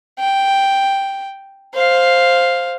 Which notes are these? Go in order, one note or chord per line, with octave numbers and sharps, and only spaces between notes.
G5
C5 F5